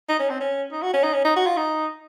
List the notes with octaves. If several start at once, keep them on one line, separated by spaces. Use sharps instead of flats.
D#4
C#4
C4
C#4
D#4
F#4
C#4
D#4
C#4
D#4
F#4
F4
D#4